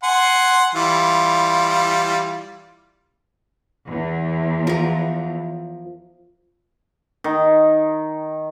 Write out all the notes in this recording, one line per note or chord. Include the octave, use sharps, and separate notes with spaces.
F#5 G#5 C6
E3 G3 F4
E2
F3 A#4
D#3